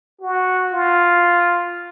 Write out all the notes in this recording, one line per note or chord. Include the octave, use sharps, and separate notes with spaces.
F#4
F4